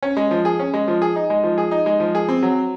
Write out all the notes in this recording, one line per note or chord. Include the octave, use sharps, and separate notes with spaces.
C#4
G#3
F3
G#4
C#4
G#3
F3
G#4
D#4
G#3
F3
G#4
D#4
G#3
F3
G#4
C4
F#3